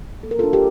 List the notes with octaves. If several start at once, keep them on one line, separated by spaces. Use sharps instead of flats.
A#3 A4
A#4
F4 A4
D4
G4 A#4